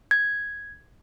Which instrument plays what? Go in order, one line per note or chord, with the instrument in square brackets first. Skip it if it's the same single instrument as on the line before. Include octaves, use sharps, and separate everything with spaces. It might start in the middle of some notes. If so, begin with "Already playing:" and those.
[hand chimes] G#6